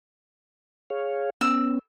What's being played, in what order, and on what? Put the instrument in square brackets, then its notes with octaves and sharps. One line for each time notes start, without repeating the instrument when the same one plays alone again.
[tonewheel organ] G#4 C#5 F5
[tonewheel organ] B3 C#4 [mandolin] E6